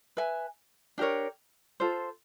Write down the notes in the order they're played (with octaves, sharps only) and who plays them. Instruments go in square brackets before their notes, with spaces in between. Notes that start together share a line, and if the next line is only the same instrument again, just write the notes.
[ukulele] B4 E5 G#5
D4 G4 A#4 C#5
F4 A4 C5